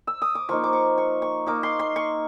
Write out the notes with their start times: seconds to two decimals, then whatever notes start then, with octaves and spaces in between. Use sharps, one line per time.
0.07 E6
0.22 D#6
0.35 D6
0.49 F3 A#3 D#4 C#6
0.64 D6
0.73 C#6
0.98 C#6
1.22 C#6
1.46 A#3 D#4 D6
1.63 C6
1.79 C6
1.96 C#6